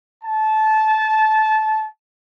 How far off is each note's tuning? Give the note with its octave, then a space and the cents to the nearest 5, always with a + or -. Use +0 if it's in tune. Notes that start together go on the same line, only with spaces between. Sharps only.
A5 -20